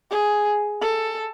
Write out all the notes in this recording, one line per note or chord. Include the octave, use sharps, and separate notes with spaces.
G#4
A4